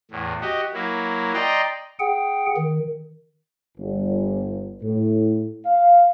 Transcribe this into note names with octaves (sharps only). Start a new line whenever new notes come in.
E2 A2
F#4 G4 D#5
F#3 A#3 E4
D5 D#5 G5 A#5 C6
G#4 F#5 G5
D#3
G1
A2
F5